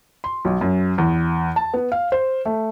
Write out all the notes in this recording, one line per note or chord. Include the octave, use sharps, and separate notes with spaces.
C6
B1
F#2
E2
A5
B3
F5
C5
A3